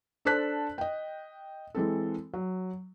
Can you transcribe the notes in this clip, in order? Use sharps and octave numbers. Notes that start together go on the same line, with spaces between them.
D4 A4 C5 A5 F#6 B6
D#5 G5
E3 G#3 C4 A4
F#3